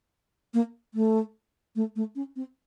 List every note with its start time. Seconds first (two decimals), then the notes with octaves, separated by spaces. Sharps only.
0.54 A#3
0.94 A3
1.76 A3
1.96 A3
2.16 C#4
2.36 C4